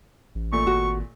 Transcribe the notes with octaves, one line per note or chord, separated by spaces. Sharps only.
A1
A#2 A3 C#6
G#1 F#4